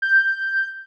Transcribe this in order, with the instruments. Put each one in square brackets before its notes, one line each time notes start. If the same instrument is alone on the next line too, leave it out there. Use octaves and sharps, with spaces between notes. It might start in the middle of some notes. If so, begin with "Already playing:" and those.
[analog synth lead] G6